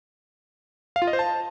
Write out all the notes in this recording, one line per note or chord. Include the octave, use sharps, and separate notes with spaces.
F5
F4
D#5
C5
A5